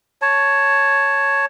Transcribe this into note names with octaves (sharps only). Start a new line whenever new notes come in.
C#5 A5